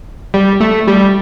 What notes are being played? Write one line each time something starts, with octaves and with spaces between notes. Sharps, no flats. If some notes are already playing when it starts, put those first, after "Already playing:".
G3
A3
G3